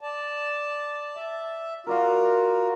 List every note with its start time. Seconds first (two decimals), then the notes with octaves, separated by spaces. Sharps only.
0.01 D5 A5
1.16 E5
1.87 F4 F#4 A#4 D5 F5